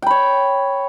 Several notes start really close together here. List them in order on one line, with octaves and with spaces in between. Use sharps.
G5 B5 C#5